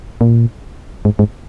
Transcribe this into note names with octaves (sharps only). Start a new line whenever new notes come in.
A#2
G#2
G#2